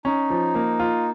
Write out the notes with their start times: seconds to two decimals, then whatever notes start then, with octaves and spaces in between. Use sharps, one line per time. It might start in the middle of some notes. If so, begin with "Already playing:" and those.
0.05 C#4 D#4
0.30 F3
0.55 A#3
0.80 F4